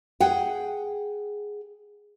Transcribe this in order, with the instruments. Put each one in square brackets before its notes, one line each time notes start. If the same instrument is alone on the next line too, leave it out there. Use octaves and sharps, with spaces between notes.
[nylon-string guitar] G#4 F#5 G5